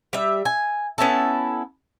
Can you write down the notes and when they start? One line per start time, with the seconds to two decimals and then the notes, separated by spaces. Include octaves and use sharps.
0.13 G3 E5
0.45 G#5
0.98 B3 C#4 E4 A4